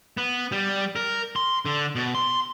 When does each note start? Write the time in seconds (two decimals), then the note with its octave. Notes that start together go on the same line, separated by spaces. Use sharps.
0.17 B3
0.52 G3
0.96 A#4
1.36 C6
1.65 D3
1.95 B2
2.15 C6